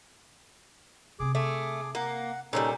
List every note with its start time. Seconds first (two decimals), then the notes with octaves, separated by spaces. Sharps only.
1.20 C3 C4 G#4 D6
1.35 A3 G#4 D6
1.95 A#3 F#5
2.53 A#2 F3 G3 C#4 D#4 A4